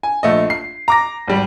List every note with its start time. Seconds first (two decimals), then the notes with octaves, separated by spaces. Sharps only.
0.03 G#5
0.23 A#1 A3 D#5
0.50 C7
0.88 A#5 D6 A#6
1.27 G#1 G3